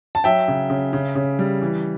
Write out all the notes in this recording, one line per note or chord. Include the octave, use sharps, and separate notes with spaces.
A5
F#3 E5 G5
C#3
C#3
C#3
C#3
G3
E3